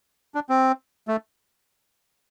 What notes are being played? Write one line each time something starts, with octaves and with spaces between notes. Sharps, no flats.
D4
C4
A3